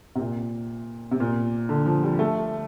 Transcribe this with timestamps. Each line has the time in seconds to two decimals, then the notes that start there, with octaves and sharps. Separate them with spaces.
0.15 C3
0.19 A#2
1.11 C3
1.20 A#2
1.69 D3
1.86 F3
2.03 G3
2.19 A3